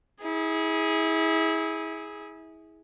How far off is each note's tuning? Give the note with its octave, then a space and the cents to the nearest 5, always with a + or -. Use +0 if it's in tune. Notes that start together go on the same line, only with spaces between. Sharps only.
E4 -30 G#4 +0